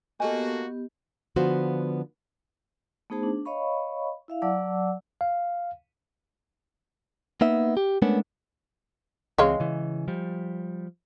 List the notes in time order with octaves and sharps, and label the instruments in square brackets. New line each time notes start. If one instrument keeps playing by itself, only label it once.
[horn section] A#3 F#4 [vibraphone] B3 G4 [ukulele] A4 G#5 [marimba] D#5
[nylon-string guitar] D3 F3 B3 F4 F#4 C5
[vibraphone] A3 B3 D#4 G#4 C5 A5
D4
C#5 D#5 F5 B5 C#6
E4 E5 F5
F#3 D5 F#5 A5 D6 E6
[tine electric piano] F5
[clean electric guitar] A#3 B3 D#4 E5
G4
G#3 A3 B3 C#4 D4 A#4
[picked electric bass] C#2 E3 C4 [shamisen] G#3 C#5 F5
[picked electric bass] C#3 E3
F3 G3